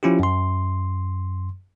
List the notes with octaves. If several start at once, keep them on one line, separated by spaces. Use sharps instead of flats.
F3 C#4 E4 F4 G4
F#2 C6